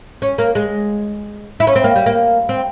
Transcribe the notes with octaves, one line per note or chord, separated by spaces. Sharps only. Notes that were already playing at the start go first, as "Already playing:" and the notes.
C#4
A#3
G#3
E4
C#4
C4
A#3
G3
A#3
C4